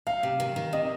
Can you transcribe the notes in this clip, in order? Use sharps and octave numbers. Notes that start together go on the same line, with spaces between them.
D#4 F5
C3
D#3
D#3
C3 D#5